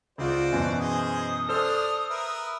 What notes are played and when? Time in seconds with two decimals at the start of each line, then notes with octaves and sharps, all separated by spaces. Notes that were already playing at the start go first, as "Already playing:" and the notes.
0.18 C#2 F4 F#4 C5 D5
0.52 F#2 B2 E3
0.79 G#4 C5 D#5 D#6
1.49 D4 A4 C5 F6
2.10 A#4 B4 E5